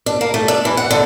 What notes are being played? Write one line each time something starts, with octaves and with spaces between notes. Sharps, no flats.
D4
A#3
A3
D4
E3
F#5
D3